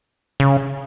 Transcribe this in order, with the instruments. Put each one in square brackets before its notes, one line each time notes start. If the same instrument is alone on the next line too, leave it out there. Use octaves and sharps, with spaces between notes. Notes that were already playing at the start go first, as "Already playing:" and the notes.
[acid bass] C#3